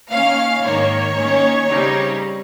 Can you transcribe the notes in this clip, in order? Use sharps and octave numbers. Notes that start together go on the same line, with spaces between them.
D#3 A#3 C#4 F5
G#2 D#3 A#3 C#5
D#3 A#3 C#4
C#3 G3 C4 D#4